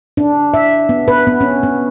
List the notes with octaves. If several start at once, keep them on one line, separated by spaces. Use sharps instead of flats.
D4
E5
B3
B4
B3
C#4
B3